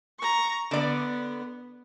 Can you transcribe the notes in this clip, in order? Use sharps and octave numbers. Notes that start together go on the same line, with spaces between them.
A#5 C#6
D3 B3 D5